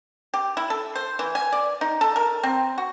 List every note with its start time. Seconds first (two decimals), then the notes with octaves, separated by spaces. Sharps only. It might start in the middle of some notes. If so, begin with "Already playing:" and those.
0.34 G4
0.57 E4
0.70 A4
0.95 C5
1.19 E3
1.35 G#5
1.52 D5
1.81 D#4
2.01 A4
2.16 A#4
2.43 C4
2.78 F#4